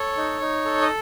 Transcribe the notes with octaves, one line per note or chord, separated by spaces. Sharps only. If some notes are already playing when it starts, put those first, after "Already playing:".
Already playing: A4 C#5
D#4
D#4
A4
D#5